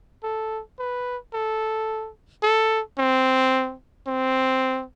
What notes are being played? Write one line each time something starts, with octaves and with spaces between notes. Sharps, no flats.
A4
B4
A4
A4
C4
C4